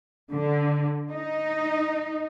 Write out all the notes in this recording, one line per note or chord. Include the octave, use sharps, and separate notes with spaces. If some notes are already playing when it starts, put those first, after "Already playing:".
D3
D#4